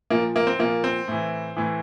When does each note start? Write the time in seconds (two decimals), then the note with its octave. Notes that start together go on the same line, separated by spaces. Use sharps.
0.10 A#2 F3 A#3
0.36 A#3
0.47 C4
0.59 A#2 F3 A#3
0.84 C4
1.08 A2 E3
1.57 A2 E3